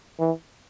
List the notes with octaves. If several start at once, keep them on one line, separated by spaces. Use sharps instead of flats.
E3